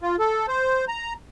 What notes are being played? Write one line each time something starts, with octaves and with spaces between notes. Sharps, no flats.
F4
A4
C5
A#5